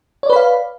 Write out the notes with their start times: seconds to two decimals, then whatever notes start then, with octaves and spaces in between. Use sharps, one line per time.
0.23 C#5
0.26 D5
0.30 B4
0.33 B5
0.36 F5